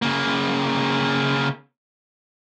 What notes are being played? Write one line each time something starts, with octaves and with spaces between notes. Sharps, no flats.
C#3 A#3